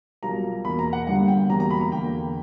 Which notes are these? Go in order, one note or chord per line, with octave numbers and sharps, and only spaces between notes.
B1 A#2 G3 A#3 A#5
E2 B2 A#3 B5
A#5
F#5
G1 G2 D3 G3 A#3 F#5
G5
E1 E2 B2 G3 A#3 A#5
A#5
B5
A#5
E2 D3 A#3 G5